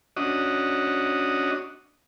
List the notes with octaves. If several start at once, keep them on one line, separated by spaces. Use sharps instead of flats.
C#4 D4 F#4 D#5